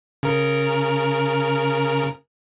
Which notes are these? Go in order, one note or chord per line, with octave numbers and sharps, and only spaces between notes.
C#3 A#4